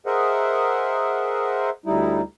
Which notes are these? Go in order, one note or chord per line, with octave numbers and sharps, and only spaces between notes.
G#4 A#4 C5 D#5 E5 F#5
D2 G3 D#4 E4